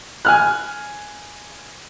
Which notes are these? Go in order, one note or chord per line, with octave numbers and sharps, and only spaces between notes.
G#5 F6 F#6